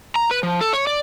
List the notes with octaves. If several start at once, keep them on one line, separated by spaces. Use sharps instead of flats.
A#5
B4
F3
A4
C#5
D5